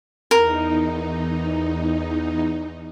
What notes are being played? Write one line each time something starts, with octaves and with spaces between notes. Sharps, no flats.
E2 D#4 A#4